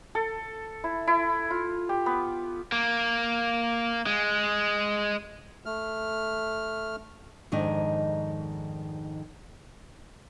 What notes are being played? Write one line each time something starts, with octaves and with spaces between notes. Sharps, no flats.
A4
E4
E4
F4
G4
B3
A#3
G#3
A3 F6
F2 G#2 D#3 D4